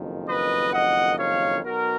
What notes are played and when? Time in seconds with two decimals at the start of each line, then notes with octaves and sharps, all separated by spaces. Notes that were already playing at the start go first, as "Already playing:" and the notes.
Already playing: F#1 F2 D#3
0.28 B4 D#5
0.73 D#5 F#5
1.19 C#5 F5
1.64 B1 B2 F#4 A#4